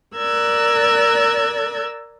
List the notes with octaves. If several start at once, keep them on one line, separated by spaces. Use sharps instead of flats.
A#4 D5 E6 F#6 G#6